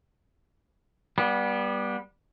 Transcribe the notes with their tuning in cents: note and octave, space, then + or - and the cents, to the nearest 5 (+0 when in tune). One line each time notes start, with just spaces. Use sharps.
G3 +0 B3 -25